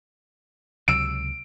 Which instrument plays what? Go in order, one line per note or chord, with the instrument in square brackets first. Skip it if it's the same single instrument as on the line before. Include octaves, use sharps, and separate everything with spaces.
[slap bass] C#2 C3 F#3 [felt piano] E6 D7